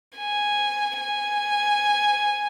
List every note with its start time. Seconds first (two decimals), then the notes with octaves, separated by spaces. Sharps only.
0.17 G#5
1.00 G#5